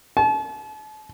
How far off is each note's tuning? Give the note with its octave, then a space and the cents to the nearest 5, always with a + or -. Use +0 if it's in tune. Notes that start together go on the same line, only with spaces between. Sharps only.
A5 -40